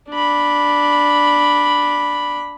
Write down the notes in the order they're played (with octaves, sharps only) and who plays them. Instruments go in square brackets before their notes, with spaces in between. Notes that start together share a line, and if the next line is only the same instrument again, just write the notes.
[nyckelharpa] D4 B5